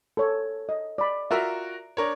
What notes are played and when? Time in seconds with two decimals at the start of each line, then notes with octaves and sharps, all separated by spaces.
0.17 A4 C#5
0.69 D#5
0.98 D5 B5
1.31 F4 F#4 A#4 E5 A#5
1.97 D4 A#4 C#5